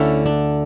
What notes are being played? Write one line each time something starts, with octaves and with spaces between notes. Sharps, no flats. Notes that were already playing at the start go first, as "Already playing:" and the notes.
Already playing: D2 D3 A3 C#4 E4
D4